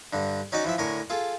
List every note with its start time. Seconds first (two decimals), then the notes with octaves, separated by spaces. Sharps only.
0.13 G2 D3
0.52 C#4 D#4 F#4 D5 D#5
0.65 E3 F3 E5
0.78 A2 D3 A#4 G#5 C#6
1.10 F4 G#4 A4